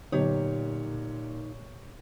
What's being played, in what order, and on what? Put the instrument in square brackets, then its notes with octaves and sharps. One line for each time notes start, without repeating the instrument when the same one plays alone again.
[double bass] A#2 [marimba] D3 F#3 B3 [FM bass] D#4 [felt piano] G4 C#5